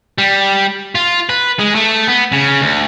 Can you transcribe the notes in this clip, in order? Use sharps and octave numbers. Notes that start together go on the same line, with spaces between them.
G3
F4
B4
G#3
A3
B3
C#3
D2